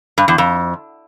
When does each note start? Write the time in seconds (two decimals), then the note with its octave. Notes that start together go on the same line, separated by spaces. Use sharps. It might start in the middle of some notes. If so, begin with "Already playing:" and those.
0.18 G2
0.28 E2
0.38 F2